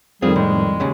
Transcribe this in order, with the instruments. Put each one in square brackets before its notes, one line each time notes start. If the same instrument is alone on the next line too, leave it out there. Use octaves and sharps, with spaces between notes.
[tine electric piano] F2 D#3 [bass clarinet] G3 [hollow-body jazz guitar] C4 F4 [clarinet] G#4
[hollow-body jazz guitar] A2 [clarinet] G#3
[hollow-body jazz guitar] D#2 C#3